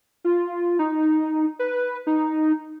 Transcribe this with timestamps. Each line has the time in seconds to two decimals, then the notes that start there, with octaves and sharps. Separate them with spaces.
0.24 F4
0.79 D#4
1.59 B4
2.07 D#4